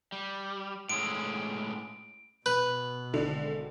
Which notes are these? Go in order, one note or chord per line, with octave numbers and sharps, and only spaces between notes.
G3
A2 G#3 C#4 D7
B2 B4
G#1 D3